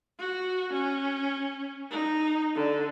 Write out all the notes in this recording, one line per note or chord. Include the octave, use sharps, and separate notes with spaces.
F#4
C#4
D#4
D3